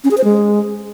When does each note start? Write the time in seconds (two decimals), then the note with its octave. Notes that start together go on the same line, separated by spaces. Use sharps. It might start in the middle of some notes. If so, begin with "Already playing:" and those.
0.04 C#4
0.11 G#4
0.18 C5
0.24 G#3